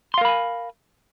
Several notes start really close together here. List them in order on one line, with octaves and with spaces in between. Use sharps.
C6 F5 A#4 B5 G#5